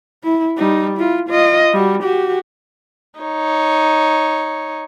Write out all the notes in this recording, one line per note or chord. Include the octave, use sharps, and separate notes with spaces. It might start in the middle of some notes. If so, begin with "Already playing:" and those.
E4
G3 D#4
E4 F4
F4 D#5
G3 F#4
F#4 G4
D#4 C#5